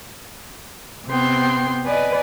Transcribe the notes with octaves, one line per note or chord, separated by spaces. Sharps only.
C3 B3 G5 C6
B4 D5 D#5 G#5